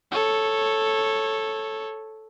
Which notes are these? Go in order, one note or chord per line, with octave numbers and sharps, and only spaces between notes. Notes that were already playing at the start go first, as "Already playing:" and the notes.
A4 C#5